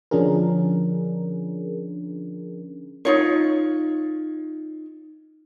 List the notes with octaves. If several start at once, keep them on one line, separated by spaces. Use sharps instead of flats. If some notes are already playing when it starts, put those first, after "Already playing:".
D3 F3 C#4 D4 G#4 A#4
D#4 F4 C#5